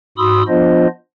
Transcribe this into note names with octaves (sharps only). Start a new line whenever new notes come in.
G#2 F#4 B5 C6 D#6 E6
F3 B3 D4 F4 C5 D#5